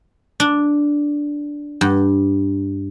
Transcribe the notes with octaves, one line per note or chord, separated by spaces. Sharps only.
D4
G2